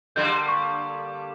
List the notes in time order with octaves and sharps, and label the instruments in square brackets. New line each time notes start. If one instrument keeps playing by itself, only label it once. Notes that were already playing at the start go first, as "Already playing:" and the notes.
[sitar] D3 G3 A#3 [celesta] G6
[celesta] C#6